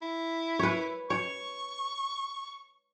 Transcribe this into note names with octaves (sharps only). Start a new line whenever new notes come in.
E4
B4 C#5
C#5 C#6